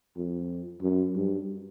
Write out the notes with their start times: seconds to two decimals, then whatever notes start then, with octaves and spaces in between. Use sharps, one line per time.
0.17 F2
0.82 F#2
1.15 G2